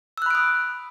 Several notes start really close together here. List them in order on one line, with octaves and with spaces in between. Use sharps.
E6 F#6 B5 D7 D#6